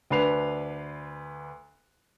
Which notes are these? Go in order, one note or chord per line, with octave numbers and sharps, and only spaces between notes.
D2 D4 B4 C7 F7